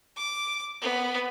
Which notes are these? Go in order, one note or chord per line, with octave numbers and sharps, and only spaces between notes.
D6
B3